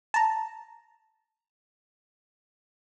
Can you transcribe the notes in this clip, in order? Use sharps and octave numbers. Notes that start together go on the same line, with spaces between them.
A5 A#5